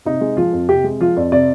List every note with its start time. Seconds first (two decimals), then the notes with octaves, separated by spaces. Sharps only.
0.05 C3 D#4
0.21 G#3
0.37 F3 F4
0.53 F2
0.69 C3 G4
0.84 G#3
1.00 F3 F4
1.16 F2 D5
1.32 C3 D5